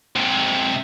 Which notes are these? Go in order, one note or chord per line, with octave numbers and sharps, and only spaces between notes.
G#2 C3